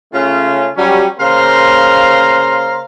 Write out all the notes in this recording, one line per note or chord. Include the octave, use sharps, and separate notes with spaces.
C#3 A3 C#4 F4
F#3 G3 C#4
C#3 A#3 C5 F5 A#5 C6